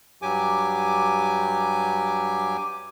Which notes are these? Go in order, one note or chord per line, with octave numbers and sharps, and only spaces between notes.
G2 F#3 G4 G#5 D6